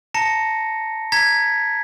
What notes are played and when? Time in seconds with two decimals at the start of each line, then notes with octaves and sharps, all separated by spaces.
0.14 A5 A#5 A#6 C#7
1.12 A#5 G#6 B6